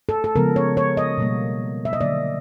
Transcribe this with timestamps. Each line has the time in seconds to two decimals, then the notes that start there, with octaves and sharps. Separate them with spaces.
0.09 A4
0.24 A4
0.36 C#3 F3 G#3 B3 A#4
0.56 C#5
0.77 C#5
0.97 D#5
1.18 B2 G3 A#3
1.85 E5
1.93 D#5
2.01 D3 F#3 A#3 D5